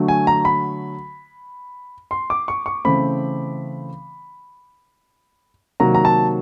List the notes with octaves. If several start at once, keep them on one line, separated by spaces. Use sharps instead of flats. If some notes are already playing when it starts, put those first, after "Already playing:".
Already playing: D3 F#3 A3
G#5
A#5
B5
C6
D6
C#6
C#6
C#3 E3 A3 C4 B5
C3 D#3 F#3 A#3 A#5
A#5
A5